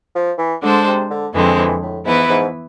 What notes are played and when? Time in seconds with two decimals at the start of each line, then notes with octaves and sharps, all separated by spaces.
0.15 F3
0.38 E3
0.62 D3 G#3 D4 A4 C5
0.87 C3
1.10 D3
1.34 F2 D3 E3 G#3 C4
1.58 E3
1.82 A2
2.05 G#2 E3 B3 E4 B4
2.29 G#2